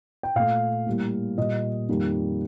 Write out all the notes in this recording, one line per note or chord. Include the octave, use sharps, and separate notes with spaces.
G5
A#2 A3 F5
A2 G3 A#3
A#2 G3 A#3 D#5
F2 D#3 G3 A#3